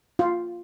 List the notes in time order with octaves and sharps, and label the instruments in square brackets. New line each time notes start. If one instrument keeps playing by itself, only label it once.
[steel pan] F4